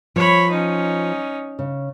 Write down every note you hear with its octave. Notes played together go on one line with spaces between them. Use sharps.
F3 C#5 B5
C#4 D#4
C#3